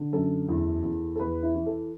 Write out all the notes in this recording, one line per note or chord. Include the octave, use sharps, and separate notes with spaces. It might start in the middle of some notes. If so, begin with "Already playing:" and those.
Already playing: D3
F#2 A4
E2
E2
A4
E2 B4
E4
E3
A4